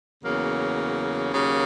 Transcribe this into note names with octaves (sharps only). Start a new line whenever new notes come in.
E2 C#3 F#3 A#3
D#2 C#3 F#3 A#3